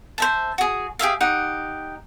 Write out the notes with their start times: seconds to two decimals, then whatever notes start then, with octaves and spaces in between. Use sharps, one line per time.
0.18 C5 E5 A5
0.58 F#4 G#4
0.99 G4 G#4 E5 F5
1.21 D#4 G4 F#5